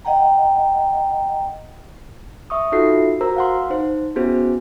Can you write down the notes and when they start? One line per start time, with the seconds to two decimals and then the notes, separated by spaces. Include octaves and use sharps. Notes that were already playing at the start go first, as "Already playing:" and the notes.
0.05 D#5 F#5 G5 A#5
2.50 E5 C#6 D#6
2.72 D#4 F4 F#4 A4 E5 C7
3.21 F#4 A#4 C5 A#5 E6
3.36 F5 F#5 C6
3.70 D#4 C5
4.16 B3 C#4 E4 F#4 G#4 C5